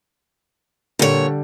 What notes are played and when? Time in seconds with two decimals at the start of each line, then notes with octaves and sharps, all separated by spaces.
0.99 A#2 D3 G3 C#5